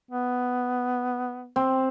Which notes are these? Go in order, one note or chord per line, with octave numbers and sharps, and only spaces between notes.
B3
C4